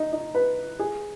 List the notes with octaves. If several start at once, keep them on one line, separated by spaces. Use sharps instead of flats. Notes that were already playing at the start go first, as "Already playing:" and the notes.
Already playing: D#4
D#4
B4
G#4